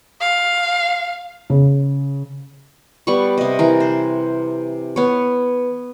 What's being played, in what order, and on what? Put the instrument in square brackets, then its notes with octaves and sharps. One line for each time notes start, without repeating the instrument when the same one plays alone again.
[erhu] F5
[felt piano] C#3
[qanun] G3 B3 F#5 C#6
C3 D#5
E3 A#4
C5
B3 C#5